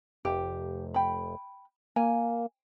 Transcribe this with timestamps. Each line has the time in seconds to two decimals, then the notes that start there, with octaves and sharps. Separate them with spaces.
0.25 F1 G4
0.94 G5 B5
1.96 A#3 G#5